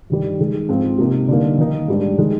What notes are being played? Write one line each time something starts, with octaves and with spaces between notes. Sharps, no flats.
G2 D#3 G3
D#3 G#3 D#4
G#2 F3 C4 F4
C3 F3 A#3 D#4
D3 G3 A#3 D#4
D#3 A#3 D#4
G#2 G3 D4
D#3 G#3 D#4